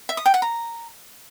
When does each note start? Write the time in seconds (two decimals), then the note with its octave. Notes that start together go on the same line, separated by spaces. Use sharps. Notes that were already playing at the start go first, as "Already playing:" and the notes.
0.09 E5
0.17 D#6
0.26 G5
0.34 F#5
0.42 A#5